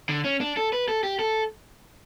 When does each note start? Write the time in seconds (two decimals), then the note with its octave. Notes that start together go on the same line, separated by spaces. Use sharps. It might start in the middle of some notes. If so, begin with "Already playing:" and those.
0.09 D3
0.25 C#4
0.41 D4
0.57 A4
0.73 B4
0.88 A4
1.03 G4
1.19 A4